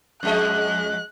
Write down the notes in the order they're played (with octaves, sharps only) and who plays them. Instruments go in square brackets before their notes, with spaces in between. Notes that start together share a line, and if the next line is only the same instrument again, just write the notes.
[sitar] F2 G#3 D#5 [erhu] F#6